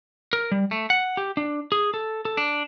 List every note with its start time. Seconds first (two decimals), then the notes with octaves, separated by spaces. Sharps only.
0.33 A#4
0.52 G3
0.71 A3
0.90 F#5
1.17 G4
1.37 D4
1.72 G#4
1.94 A4
2.25 A4
2.37 D4